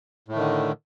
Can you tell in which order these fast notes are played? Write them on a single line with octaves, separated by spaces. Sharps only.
A2 A3 D#3 D3